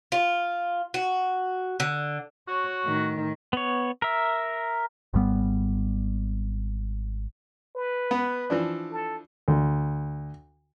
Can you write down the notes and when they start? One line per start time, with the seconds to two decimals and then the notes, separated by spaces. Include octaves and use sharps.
0.12 F4
0.94 F#4
1.80 D3
2.48 F#4 C#5
2.84 A2 D#3
3.53 B3 C#5
4.02 A#4 E5
5.14 G#1 G#2 G3 B3
7.76 B4
8.11 B3
8.50 E3 F3 D4
8.92 A4
9.48 D2